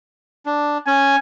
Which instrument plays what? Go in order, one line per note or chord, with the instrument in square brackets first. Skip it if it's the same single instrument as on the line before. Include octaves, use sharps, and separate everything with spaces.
[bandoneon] D4
[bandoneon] C#4 [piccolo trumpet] G#5